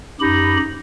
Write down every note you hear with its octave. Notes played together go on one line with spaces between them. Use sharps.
F#2 D#4 G4 B5